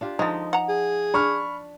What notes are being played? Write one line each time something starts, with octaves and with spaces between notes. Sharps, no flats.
D4 F4 G4
D3 F3 G#3 D#4
F#5 A#5
G#4
D4 B5 C#6 F6